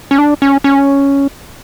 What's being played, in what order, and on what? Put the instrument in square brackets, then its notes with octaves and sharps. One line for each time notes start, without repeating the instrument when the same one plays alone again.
[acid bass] C#4
D4
C#4
C#4